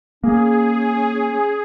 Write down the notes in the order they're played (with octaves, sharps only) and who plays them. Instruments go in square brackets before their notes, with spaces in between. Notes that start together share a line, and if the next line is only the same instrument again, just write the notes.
[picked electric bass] A#3 [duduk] C#4 [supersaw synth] G#4